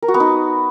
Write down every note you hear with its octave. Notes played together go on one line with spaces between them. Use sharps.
A#4
F#4
B3
D#4